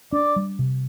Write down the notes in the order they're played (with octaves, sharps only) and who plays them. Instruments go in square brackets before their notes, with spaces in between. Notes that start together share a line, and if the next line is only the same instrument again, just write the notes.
[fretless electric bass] D4 [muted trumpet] D5
[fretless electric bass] G3
C3